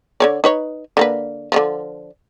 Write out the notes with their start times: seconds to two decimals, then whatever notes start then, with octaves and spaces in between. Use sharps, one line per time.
0.20 D3 C#5 D5
0.44 D#4 B4 C#5
0.97 D3 A#3 B4
1.52 D3 D#3 F3